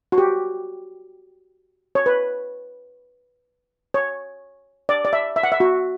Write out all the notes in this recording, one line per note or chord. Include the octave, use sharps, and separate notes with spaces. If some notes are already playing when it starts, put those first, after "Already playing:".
F#4
G4
C#5
B4
C#5
D5
D5
E5
E5
F#5
E5
F#4